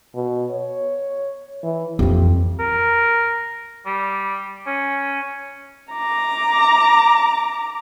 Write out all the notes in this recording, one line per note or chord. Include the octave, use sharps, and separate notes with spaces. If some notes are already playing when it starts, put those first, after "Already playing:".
B2
C#5
E3
F2 E3 G4
A#4
G3
C#4
A#5 D6